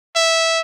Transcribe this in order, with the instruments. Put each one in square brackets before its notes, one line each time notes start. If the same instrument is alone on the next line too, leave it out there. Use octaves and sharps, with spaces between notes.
[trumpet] E5